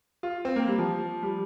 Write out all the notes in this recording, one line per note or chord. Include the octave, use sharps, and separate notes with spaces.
F4
C4
A#3
G3
F3
G3